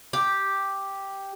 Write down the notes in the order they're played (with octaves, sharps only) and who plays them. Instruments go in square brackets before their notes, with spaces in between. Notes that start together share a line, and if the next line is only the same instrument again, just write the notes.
[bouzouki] G4